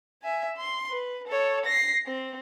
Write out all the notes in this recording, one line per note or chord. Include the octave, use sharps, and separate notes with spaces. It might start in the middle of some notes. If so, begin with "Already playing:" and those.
E5 G#5
C6
B4
A4 C#5
A#6 C7
C4